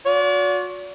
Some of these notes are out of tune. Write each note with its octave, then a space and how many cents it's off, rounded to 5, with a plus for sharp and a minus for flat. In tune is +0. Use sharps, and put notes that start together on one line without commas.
F#4 -40 D5 -40